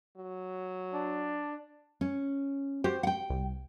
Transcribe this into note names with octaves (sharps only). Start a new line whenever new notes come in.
F#3
D4
C#4
F#4 G4 C5
F#5 G5
C2